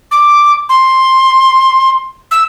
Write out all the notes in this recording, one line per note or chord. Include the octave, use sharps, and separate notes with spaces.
D6
C6
E6